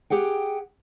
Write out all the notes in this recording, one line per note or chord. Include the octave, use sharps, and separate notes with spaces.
G4 G#4 F#5 G5